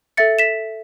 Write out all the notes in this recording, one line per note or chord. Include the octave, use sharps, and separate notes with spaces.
A4 E5 A6 C#7
B6 E7